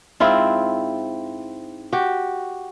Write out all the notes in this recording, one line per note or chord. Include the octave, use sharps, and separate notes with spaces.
G#2 C4 E4 F4
F#4 G4